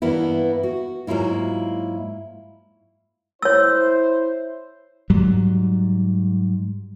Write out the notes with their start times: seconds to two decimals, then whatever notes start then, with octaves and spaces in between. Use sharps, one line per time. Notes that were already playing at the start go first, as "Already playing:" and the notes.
0.02 G2 E3 A#3 B3 E4
0.63 F#4
1.07 G#2 F#3 A#3 E4 F4
3.42 E4 C5 C#5 E6
5.10 G#2 F#3 G3